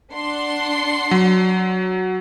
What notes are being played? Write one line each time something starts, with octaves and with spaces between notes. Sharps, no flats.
D4 F#5 C6
F#3